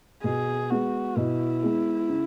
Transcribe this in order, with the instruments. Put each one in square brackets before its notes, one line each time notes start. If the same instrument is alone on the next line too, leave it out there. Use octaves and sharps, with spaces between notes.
[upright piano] B2 [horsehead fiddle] G#4
[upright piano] G#3 B3 [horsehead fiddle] F#4
[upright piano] B2 [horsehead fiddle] E4
[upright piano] G#3 B3
C#3